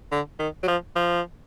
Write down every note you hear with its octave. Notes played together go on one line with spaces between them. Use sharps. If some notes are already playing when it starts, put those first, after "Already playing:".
D3
D#3
F#3
F3
F3